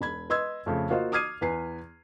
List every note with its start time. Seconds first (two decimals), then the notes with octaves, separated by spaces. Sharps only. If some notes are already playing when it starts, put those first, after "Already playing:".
0.01 E1 B5 G#6
0.30 B4 D#5 C6 E6 G#6
0.66 F2 C#3 A3
0.90 A#3 F4 F#4 C5 D#5 F5
1.12 D6 D#6 F6 G#6 C7 D#7
1.41 E2 B4 G#5 C7